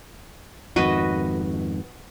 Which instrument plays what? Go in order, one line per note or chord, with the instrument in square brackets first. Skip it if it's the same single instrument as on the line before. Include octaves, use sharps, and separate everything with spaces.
[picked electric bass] F2 G#2 D#3 [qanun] F#4 B4 D#5